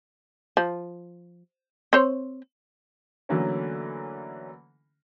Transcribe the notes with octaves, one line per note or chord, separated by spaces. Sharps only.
F3
C4 C5 C#5
D3 E3 F#3 A3 A#3 C#4